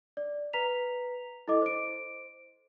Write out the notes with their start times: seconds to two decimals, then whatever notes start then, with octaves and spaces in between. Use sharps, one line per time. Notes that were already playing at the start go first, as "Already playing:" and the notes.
0.17 D5
0.53 B4 A#5 B6 F7
1.48 E4 A4 D#5 D6
1.62 C5 D7